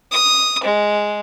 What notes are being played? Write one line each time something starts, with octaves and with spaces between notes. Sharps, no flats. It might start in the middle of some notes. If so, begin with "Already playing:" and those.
D#6
G#3